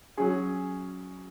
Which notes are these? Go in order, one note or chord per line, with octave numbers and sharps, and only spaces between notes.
F#3 C#4 G#4